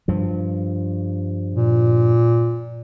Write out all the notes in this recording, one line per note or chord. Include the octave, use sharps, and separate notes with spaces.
G2 F3
A#2